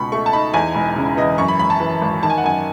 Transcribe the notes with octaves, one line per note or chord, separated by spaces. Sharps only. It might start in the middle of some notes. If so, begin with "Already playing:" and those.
Already playing: C#2 B2 B5 C#6
A3 C#6
A5
D#4 B5
E2 G#5
E1
C#3
E3 D#5
F#2 C#6
B5
G#1 B5
A5
E3
G#1
D#3 A5
G#5
F#5
F#2 G#5